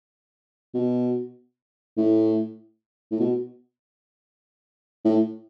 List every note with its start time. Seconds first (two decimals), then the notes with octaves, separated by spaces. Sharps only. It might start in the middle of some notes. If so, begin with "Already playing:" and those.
0.74 B2
1.97 A2
3.12 A2
3.20 B2
5.05 A2